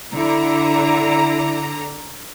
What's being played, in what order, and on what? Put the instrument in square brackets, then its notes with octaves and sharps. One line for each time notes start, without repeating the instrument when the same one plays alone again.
[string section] D3 A#5 [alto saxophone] E4